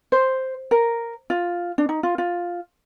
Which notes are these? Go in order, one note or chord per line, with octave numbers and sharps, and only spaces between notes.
C5
A#4
F4
D4
D#4
F4
F4